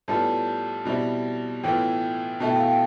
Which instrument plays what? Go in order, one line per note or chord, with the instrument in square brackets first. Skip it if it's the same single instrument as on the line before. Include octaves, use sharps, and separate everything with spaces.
[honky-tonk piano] A2 G3 B3 F4 [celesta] A5
[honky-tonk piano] B2 G3 C4 E4
[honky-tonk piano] A2 E3 B3 F4 [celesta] G5
[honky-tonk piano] B2 A3 E4 [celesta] A5
[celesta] G5
F5
G5